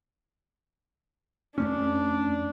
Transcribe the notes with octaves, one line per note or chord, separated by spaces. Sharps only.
F2 A3 C#4 D4